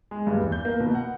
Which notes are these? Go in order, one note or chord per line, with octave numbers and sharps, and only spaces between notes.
G#3
G2
E2
G6
A#3
B2
F#5